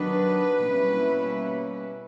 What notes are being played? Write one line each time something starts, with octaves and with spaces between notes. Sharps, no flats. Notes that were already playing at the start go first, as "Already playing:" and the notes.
Already playing: D#3 F#3 B3 D4 B4
B2 G3 A#3 C#4 E4